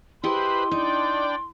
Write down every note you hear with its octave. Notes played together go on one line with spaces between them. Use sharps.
E4 G4 B4 C5 D#5 B5 C6
D4 D#4 D5 G5